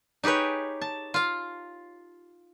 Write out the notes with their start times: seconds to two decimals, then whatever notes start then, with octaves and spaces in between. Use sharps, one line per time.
0.24 D#4 G4 G#4 B4 C#5
0.81 A5
1.14 F4 F5